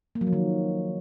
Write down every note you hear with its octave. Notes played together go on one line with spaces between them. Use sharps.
A#3
F#3
F3
D#3